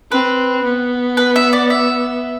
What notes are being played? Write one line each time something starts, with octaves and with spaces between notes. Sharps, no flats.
C4 B4
B3
B4
E5
D5
E5